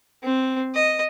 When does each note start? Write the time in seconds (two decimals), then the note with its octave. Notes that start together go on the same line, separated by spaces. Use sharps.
0.23 C4
0.74 D#5